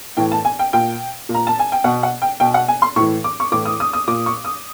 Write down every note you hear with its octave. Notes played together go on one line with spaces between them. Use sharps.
A2 E3 G5
A5
G#5
G5
A#2 G5
A#2
A#5
A5
G#5
G5
B2 F#5
F#5
G5
B2 G5
F#5
G#5
C6
A2 E3 C#6
D6
C#6
A2 E3 D6
D#6
D#6
D#6
A#2 D6
C#6
D#6